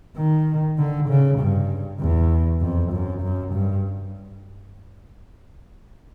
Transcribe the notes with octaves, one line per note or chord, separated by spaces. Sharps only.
D#3
D3
C#3
G2
E2
F2
F#2
F#2
G2